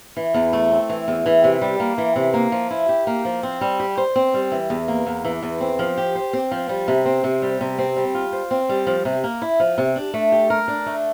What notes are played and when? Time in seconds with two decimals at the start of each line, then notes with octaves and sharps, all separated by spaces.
0.17 E3
0.34 E2
0.53 A3
0.71 C4
0.90 E3
1.08 E2
1.26 E3
1.44 C3
1.62 G3
1.80 A#3
1.98 E3
2.16 C3
2.34 A#3
2.52 F3
2.71 E4
2.89 G4
3.07 A#3
3.25 F3
3.43 C4
3.61 G3
3.80 G4
3.97 C5
4.16 C4
4.34 G3
4.52 E3
4.70 E2
4.88 A#3
5.07 E2
5.25 E3
5.43 E2
5.61 C4
5.79 F3
5.97 G4
6.15 C5
6.33 C4
6.51 F3
6.69 G3
6.88 C3
7.06 C4
7.24 C3
7.42 G3
7.61 C3
7.79 C4
7.97 G3
8.14 F4
8.33 C5
8.51 C4
8.69 G3
8.87 F3
9.05 C3
9.24 A#3
9.42 E4
9.60 F3
9.78 C3
9.96 D4
10.14 A3
10.32 G4
10.50 A#4
10.68 D4
10.86 A3